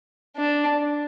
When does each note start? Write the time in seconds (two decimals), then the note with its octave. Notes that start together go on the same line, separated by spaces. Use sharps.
0.37 D4